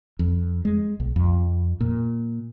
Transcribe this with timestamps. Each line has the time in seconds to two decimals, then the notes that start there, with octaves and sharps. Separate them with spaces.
0.19 F2
0.65 G#3
1.00 B1
1.16 F2
1.81 A#2